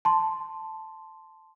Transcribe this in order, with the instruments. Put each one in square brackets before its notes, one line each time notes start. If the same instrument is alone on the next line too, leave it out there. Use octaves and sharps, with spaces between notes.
[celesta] A5 C6